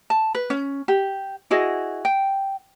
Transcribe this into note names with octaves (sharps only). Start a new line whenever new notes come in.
A5
B4
C#4
G4
E4 F#4 G#4 D#5
G5